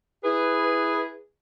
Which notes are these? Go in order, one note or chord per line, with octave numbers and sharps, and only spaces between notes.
E4 G#4 B4